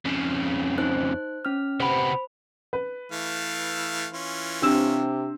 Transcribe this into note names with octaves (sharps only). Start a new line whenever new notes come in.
F2 C#3
D#4 C5 F#6
C#4 F6
C3 B3 C5 B5
B4
E3 A3 F5
E3 C#4 F4
C3 C4 D4 G4 E6 E7